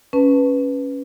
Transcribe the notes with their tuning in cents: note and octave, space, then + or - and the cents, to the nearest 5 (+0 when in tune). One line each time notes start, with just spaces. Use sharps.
C#4 +0 B4 +0 A5 +10